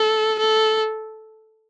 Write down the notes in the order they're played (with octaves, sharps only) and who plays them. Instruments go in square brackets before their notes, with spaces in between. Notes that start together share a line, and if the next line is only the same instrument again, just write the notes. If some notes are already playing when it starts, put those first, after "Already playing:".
Already playing: [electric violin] A4
A4